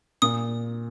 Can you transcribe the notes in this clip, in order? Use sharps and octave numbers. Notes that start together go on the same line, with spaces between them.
A#2 D#6